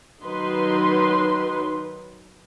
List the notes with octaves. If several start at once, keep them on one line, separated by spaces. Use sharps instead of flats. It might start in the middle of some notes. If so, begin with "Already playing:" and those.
D#3 F#3 D#4 B4 C6